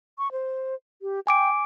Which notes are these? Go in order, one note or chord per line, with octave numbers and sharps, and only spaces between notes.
C#6
C5
G4
G5 G#5 D6 D7